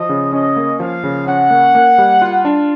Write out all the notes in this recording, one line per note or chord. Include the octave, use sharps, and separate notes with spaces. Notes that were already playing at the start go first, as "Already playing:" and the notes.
Already playing: F3 D#5
C#3
C#4 D#5
A#3
F3 F5
C#3
C#4 F#5
A#3
A#3
G3
F4
D4